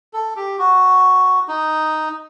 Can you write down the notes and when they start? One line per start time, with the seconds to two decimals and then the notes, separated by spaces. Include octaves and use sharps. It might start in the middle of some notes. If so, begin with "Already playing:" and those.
0.13 A4
0.36 G4
0.59 F#4
1.48 D#4